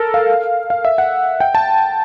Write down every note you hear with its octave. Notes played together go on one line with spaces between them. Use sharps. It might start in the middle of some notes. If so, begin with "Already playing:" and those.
Already playing: A4 A#4
F5
F5
E5
F#5
G5
A5